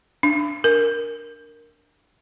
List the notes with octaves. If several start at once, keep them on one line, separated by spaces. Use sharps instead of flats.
D4
A#4